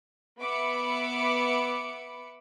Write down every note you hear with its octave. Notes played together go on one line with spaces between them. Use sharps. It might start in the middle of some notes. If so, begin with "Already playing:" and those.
B3 E5 B5 D6 C#7